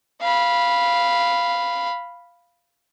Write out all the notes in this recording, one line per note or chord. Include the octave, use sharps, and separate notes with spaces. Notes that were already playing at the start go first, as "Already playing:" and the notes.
F5 B5